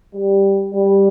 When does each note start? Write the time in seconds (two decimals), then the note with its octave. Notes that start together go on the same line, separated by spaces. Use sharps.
0.14 G3
0.73 G3